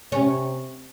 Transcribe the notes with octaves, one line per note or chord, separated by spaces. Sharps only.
C3 C#4